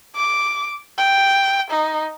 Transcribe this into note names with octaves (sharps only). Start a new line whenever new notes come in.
D6
G5
D#4